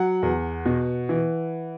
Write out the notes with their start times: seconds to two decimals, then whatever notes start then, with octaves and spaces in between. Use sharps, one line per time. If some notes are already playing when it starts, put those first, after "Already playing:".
Already playing: F#3 F#5
0.23 E2
0.65 B2
1.09 E3